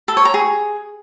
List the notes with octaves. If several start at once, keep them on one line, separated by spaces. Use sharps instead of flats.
A4
C#5
A#5
G#4